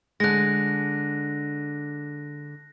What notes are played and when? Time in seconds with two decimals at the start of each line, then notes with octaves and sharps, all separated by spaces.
0.20 D3 G#3 F#6 A#6